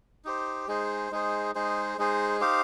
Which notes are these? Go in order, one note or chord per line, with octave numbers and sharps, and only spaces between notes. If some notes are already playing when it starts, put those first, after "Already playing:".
D#4 G4 C5
G#3 D#4 G#4 C5
G#3 D#4 G#4 C5
G#3 D#4 G#4 C5
G#3 D#4 G#4 C5
D#4 G4 C5 F5